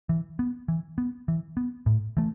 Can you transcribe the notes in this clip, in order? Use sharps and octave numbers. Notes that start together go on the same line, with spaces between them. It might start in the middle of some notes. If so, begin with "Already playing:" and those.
E3
B3
E3
B3
E3
B3
A2
E3 A3